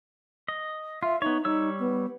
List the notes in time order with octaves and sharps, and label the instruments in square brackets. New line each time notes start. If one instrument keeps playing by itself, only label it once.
[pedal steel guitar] D#5
[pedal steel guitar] F4 [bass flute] E5
[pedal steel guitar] B3 C#5 [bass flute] D#4
[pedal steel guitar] G3 C#5 E6 [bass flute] D#4
[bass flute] B3